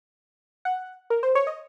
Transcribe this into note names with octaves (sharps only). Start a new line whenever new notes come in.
F#5
A#4
C5
C#5
D#5